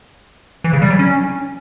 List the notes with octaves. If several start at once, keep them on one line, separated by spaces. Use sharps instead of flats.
E3
C#3
G3
F#3
C#4